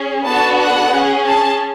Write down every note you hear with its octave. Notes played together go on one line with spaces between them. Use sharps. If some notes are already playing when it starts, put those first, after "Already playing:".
Already playing: C#4 G#4
B3 D4 F#4 A4 A5
F#5
C#4 G#4
A5